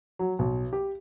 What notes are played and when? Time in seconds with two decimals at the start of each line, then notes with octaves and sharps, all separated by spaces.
0.19 F#3
0.39 B1
0.73 G4